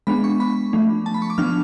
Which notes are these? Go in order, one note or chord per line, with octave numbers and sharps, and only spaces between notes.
G#3 B3 D4 B5
C#6
B5
F3 A3 D4
A5
B5
C#6
D6
F3 B3 D4 F6